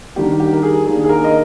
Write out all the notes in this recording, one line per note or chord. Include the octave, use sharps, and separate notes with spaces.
D#3 G3 D4 G4
G4
A#4
G#4
D#3 A#3 D4 G#4
G#4
A#4
D#5